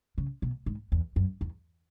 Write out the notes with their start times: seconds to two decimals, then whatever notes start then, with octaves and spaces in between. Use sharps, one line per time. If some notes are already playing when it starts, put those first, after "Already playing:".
0.18 C#3
0.42 B2
0.66 G#2
0.92 E2
1.16 F#2
1.41 E2